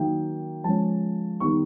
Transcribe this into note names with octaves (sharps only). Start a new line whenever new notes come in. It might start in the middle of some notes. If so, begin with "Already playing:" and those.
Already playing: D#3 F#3 A#3 D#4 G5
F3 G#3 C#4 A5
D#3 G3 B3 D#4 C#6